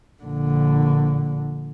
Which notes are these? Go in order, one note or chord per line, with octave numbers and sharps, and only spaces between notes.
A#1 D3